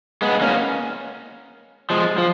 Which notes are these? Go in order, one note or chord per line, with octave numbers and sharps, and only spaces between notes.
G#3 B3
A#3 C#4
F3 G#3
F3